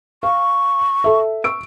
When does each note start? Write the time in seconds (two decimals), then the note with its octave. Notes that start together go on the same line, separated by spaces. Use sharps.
0.23 F5 C#6
1.04 A4 E5
1.44 C#6 E6 D7